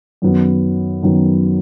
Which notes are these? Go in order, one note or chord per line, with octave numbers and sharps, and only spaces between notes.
F#2 D#3 F#3 B3
F#2 D#3 F#3 B3